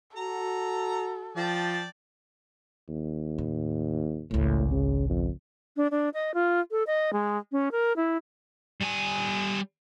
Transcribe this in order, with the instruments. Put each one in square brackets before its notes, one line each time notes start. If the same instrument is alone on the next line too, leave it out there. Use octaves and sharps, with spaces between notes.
[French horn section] F#4 [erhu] A4 [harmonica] A#5
[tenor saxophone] F3 [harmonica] D5 G5 A5
[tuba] D#2
[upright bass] A2
[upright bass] G#1 C#2 [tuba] A2
[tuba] C#3
F2
[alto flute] D4
D4
D#5
F4
A4
D#5
G#3
C#4
A#4
E4
[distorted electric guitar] G3 G#5